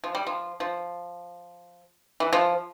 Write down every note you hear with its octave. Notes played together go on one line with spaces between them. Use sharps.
F3
G3
F3
F3
E3
F3